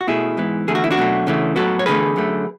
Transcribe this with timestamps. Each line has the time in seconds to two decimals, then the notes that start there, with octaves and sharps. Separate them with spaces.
0.01 F#4
0.07 B2 A3 E4 G#4
0.37 G#2 E3 B3
0.68 E2 D3 A3 G#4
0.75 F#4
0.84 E4
0.91 D4 F#4
0.98 B2 F#3 A3
1.27 C#3 E3 A3
1.56 A2 F#3 B3 F#4 A4
1.79 C#5
1.86 E2 D3 A3 G#4 B4
2.16 F#2 D3 A3